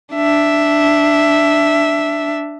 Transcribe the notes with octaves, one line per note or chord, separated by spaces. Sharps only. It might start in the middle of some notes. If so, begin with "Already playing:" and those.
D4 E5